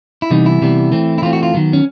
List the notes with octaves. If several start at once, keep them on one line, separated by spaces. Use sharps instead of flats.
E4
C3 E3 G3 B3 D#4
E4
C3 E3 G3 B3
E3 A3 C4
E4
E3 A3 C4 F4
F#4
F4
D#3 F#3 B3
C#4